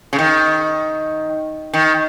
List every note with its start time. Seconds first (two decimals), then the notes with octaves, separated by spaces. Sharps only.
0.13 C#3
0.19 D#3
1.74 D#3